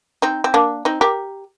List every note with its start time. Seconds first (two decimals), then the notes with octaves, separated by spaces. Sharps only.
0.22 C4 D#4
0.44 C4
0.54 A#3 D4
0.85 C4 D#4
1.01 G4 A#4